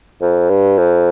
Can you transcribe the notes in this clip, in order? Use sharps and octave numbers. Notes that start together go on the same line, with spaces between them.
F2
G2
F2